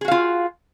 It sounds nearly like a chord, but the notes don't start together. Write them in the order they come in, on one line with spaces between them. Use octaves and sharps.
G#4 F#4 F5 F4